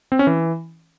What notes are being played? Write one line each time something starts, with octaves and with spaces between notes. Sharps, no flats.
C4
C#4
E3